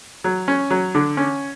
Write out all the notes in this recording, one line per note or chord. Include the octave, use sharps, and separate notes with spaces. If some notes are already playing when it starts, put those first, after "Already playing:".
F#3
C#4
F#3
D3
C#4